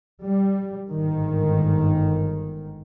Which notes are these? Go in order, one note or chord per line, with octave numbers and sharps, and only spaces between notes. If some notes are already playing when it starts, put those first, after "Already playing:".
G3
G1 G#2 D#3